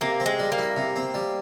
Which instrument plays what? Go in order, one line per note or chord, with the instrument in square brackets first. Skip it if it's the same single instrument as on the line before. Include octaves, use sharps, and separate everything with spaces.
[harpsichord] C3 [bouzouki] A#3
[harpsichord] C4
[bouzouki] G#3
[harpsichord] G3
[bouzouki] A#3
[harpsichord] E4
C3
C4
G3